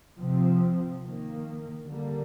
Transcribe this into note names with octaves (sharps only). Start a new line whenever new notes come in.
C3 F3 C4
D#3 A#3
D3 G3 A#3